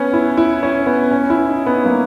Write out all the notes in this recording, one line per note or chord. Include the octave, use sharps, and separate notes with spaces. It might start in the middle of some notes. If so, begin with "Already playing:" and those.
Already playing: B3 C#4
E4
E4
C#4
B3
C#4
E4
D#4
B3
A#3